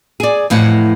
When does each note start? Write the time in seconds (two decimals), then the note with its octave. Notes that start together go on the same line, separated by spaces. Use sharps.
0.20 G#4 D5
0.50 F2 A2 E3 D#5 F#5